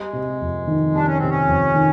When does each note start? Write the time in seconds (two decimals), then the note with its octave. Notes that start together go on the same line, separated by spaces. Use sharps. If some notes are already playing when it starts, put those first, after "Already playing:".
Already playing: G3 G#3
0.13 C3
0.41 F2
0.67 D#3
0.94 G3 D4
1.06 C#4
1.18 C3 C4
1.30 C#4
1.48 F2
1.75 D#3